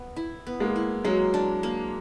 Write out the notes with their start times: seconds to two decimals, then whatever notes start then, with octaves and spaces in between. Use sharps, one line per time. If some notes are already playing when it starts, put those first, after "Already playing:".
Already playing: B3
0.16 E4
0.47 B3
0.60 G#3 A#3
0.76 E4
1.04 F#3 G#3 A#3
1.34 D4
1.63 A#3